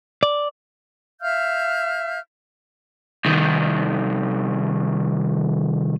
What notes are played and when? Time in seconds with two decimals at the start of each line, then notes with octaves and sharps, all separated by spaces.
0.23 D5
1.21 E5 F5 F6 G6
3.25 C2 D#3